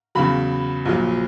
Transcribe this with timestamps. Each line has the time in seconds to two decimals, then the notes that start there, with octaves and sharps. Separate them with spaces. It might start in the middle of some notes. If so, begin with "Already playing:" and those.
0.15 E2 C#3 F#3 B5
0.85 A#1 A#2 F#3